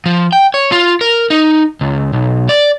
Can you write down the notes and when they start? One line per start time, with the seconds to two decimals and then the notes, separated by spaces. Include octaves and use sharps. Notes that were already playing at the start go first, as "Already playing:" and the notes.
0.06 F3
0.32 G5
0.54 C#5
0.72 F4
1.01 A#4
1.30 D#4
1.81 C#2
2.13 B1
2.49 D5